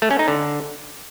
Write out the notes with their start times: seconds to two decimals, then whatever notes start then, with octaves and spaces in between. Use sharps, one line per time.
0.02 A3
0.11 C#4
0.19 D#4
0.28 D3